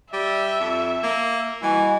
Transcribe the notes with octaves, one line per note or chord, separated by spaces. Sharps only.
G3 E5
F2
A#3
E3 G3 F#4 D#5 G#5